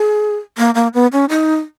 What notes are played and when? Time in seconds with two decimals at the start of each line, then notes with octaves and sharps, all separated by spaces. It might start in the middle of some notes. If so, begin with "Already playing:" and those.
Already playing: G#4
0.58 A#3
0.75 A#3
0.94 B3
1.12 C#4
1.29 D#4